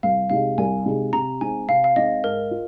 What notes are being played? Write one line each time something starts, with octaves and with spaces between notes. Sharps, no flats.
C2 F5
C3 G#3 D#4 F5
C2 G#5
C3 G#3 D#4
C3 A#5
G#3 C4 D#4 G#5
C3 F5
F5
G#3 C4 D#4 D#5
G#2 A#4
F4